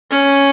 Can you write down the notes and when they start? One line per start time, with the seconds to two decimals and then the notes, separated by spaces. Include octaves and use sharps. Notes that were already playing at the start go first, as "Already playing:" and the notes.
0.11 C#4